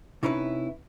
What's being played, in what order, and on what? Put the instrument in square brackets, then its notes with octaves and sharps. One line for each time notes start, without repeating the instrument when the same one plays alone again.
[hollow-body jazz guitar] C3 C#4 D#4 E4 G#4 B4